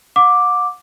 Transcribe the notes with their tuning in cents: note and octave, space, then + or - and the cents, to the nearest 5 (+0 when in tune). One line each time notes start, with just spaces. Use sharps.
F#5 -35 D6 +0